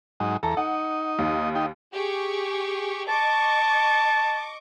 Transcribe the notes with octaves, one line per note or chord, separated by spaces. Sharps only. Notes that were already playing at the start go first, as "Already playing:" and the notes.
G#2 F#3 D#4
E2 A4 A#5
D#4 F#5
D#2
D#4 G4
G4 G#4 C#6
D#5 A5 C#6 D6